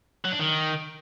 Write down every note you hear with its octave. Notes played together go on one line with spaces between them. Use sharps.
F#3
D4
D#3